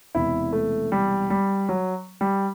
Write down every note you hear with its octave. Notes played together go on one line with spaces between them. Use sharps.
E1 E2 C3 E3 E4
A3
G3
G3
F#3
G3